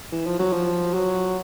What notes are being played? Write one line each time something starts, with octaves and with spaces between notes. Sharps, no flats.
E3
F3
F#3
F3
F#3